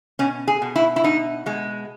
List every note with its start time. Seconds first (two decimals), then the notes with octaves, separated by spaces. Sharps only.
0.19 B2 C#4
0.48 G#4
0.62 B2
0.76 E4
0.96 E4
1.04 B2 D#4
1.46 B2 G#3